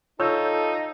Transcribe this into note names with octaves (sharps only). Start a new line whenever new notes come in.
D#4 F4 A4 C#5 F5 E6 G6